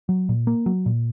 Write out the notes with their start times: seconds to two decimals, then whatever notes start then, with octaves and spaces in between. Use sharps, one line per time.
0.09 F#3
0.29 A#2
0.47 A#3
0.66 F#3
0.86 A#2